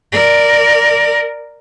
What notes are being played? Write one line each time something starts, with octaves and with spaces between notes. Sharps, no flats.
A#4 D5